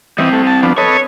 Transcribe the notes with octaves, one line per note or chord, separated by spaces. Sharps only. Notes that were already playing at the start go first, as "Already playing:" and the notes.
E3 G3 C4 D#5
A3
A5
F3 B3 D4
A4 B4 C#5 D#5